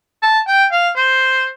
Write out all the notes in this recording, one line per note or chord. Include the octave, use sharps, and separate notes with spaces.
A5
G5
F5
C5